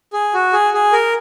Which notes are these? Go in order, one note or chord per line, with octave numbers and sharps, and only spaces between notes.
G#4
F#4
G#4
G#4
A#4